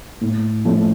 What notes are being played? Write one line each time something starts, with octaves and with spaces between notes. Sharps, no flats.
A2
F3 A3 C#4 E4